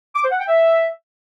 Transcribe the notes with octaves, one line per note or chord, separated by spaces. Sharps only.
D6
C5
F#5
G5
E5